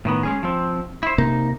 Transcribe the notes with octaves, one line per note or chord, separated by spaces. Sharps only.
A2 D#3 B3
G#3 C#4 G#4
F3 C4
E4 C5
C3 A#3 D#4